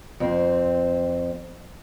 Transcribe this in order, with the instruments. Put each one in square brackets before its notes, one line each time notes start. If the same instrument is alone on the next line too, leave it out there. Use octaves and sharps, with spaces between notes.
[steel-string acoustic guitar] F2 C4